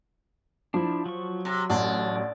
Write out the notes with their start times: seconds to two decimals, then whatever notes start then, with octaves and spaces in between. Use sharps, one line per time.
0.74 F3 D4 E4
1.06 F#3 C#6
1.45 C3
1.69 A1 D4